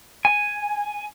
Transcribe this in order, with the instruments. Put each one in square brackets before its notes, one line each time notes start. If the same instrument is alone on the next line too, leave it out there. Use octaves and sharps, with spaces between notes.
[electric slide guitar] G#5